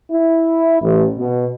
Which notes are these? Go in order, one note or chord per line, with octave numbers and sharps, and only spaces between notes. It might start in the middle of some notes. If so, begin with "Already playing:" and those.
E4
A1
B2